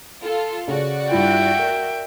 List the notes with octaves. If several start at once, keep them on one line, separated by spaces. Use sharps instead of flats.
F4 A4
C#3 F#4 D5
G2 E4 F4 E5 G5
A#4